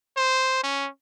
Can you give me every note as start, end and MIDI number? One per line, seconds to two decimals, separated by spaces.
0.17 0.59 72
0.64 0.89 61